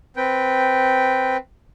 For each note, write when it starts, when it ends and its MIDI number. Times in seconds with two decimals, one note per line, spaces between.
0.17 1.37 60
0.17 1.37 71
0.17 1.37 79